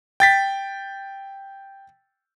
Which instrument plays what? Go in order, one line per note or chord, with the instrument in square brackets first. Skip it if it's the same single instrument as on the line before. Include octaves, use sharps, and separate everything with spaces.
[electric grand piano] G5 A6 B6